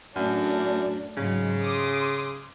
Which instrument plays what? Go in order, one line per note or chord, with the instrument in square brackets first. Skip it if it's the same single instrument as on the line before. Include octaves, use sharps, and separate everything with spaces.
[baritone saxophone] F#2 [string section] A2 D4
[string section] G#2 F#3 [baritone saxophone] C#3
[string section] C6 D6 D#6